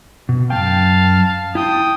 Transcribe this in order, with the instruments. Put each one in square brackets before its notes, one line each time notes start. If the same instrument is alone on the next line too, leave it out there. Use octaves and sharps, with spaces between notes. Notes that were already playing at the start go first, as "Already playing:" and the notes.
[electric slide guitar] B2
[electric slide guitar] F#2 G#3 G5 [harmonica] F5 A5
[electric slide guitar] E4 A5 [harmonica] G5 D#6